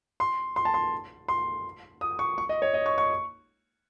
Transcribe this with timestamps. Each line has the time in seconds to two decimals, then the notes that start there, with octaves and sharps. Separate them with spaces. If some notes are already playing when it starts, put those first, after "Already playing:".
0.20 C6
0.56 C6
0.65 A5
0.74 C6
1.28 C6
2.01 D#6
2.19 C#6
2.38 C#6
2.49 D#5
2.62 C#5
2.74 D#5
2.86 C#6
2.98 C#6